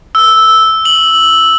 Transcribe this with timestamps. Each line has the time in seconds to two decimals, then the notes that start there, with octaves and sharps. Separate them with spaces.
0.15 E6
0.85 F#7